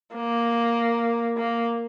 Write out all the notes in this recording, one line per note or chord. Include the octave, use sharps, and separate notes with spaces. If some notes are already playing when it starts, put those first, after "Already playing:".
A#3
A#3